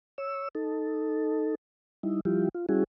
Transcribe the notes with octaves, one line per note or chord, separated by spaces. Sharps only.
C#5 E6
D#4 A4
G3 D#4 E4
F3 G3 E4 F4 G4
F4
G3 C#4 E4 F#4 G#4